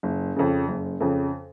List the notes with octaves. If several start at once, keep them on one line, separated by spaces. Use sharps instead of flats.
F#1
F2 C#3
F#1
F2 C#3